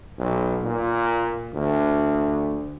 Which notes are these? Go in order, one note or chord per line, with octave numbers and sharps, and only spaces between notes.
B1
A#2
D2